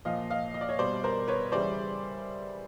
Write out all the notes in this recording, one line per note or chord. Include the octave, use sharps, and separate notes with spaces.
A#2 F3 D#5 F5
D#5 F5
D#5
D5
C#5 D#5
B2 G3 C5 D5
A#4 C5
B4 C#5
C#3 E3 G3 C5 D5